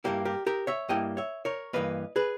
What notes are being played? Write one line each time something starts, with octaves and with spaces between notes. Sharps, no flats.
G2 G3 A#3 E4 G4
G4 A#4
G4 A#4
C#5 E5
G2 G3 A#3 E4 D#5 G5
C#5 E5
A#4 C#5
G2 E3 A#3 B4 D#5
G#4 B4